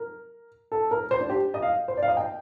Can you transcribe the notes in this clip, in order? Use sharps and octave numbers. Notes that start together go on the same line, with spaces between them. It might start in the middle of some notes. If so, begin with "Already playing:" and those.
Already playing: A#4
A4
A#4
C5
D4
G4
D#5
F5
C5
D5
F5
D#5
G5